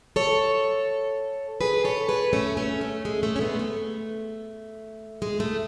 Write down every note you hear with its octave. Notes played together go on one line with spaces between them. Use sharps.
A4 C#5
G#4 B4
A4 C#5
G#4 B4
A3 C#4
A3 C#4
A3
G#3
A3
C#4
G#3 B3
A3
G#3
A3